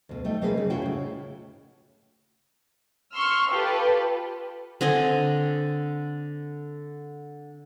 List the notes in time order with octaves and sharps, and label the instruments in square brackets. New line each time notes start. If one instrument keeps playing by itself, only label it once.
[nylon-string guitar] D2 B2
G3 A3 D#4 G5
B2 G3 A#3 C4 G#4 B4
C#3
A3 C#4 E4 F#4 F5 G5
A2 C#3
[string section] C6 C#6 E6 F6
F4 G4 A4 B4
[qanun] D3 C4 D#5 G#5